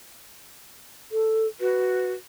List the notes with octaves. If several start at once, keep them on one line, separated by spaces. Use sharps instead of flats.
A4
F#4 B4